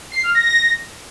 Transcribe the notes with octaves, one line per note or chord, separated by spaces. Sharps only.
C7
F6
A#6